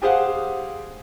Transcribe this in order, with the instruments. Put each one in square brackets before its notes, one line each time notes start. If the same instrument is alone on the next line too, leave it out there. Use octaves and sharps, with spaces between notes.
[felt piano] G4 G#4 C5 F5 F#5